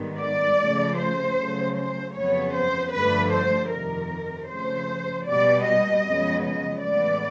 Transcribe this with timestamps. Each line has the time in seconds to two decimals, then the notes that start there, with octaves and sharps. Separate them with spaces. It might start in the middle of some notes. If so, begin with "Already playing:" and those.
Already playing: G#2 D#3 G3 B3
0.20 D5
0.59 C#3 F3 A3
0.98 C5
1.37 C#3 F#3 A3
1.76 C5
2.15 F2 C#3 F#3 B3 C#5
2.54 C5
2.93 G2 D3 F3 A3 B4
3.32 C5
3.71 F2 C3 D#3 A#4
4.49 C#3 F3 A3 C5
5.27 B2 G3 B3 D5
5.66 D#5
6.06 F#2 C#3 F3 G#3 B3
6.44 D#5
6.83 A2 E3 G#3 B3 D5